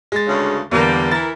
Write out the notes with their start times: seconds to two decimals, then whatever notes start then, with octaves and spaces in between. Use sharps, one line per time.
0.12 G#3 A6
0.26 D2 G2 C#3
0.71 E2 D3 G3 A#3
1.11 E3 E4 A#4 A6